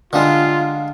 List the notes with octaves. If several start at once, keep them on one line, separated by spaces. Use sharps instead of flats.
D3 G3 G#3 F4 F5